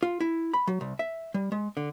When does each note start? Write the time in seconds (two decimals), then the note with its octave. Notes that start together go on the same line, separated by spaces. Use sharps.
0.03 F4
0.20 E4
0.54 B5
0.67 F#3
0.81 C2
0.99 E5
1.34 G3
1.52 G#3
1.77 D3